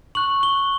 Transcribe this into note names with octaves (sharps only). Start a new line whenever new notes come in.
C#6 F#6 F#7
G7